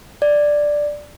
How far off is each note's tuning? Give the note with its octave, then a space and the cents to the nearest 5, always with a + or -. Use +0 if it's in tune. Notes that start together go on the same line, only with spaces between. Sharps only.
D5 +5